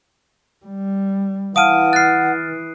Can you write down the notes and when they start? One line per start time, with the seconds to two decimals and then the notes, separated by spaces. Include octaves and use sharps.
0.65 G3
1.56 E3 F5 F#5 A5 D#6 F6 D7 D#7
1.93 F6 F#6 A6 C7